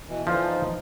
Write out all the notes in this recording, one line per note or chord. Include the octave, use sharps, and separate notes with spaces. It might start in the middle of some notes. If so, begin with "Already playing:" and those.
B2 E3
D3 E3 F3 C5
D#4